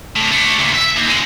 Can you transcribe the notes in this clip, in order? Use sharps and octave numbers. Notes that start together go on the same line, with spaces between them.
A2 D3
A3 D4
D2 A#2
E5
D#2
D3 G#3